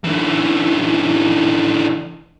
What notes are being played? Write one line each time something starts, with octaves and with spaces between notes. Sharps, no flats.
D3 E3